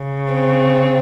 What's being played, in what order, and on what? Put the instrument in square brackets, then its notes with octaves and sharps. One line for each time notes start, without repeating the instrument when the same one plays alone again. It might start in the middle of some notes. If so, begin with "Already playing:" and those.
Already playing: [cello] C#3
[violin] C4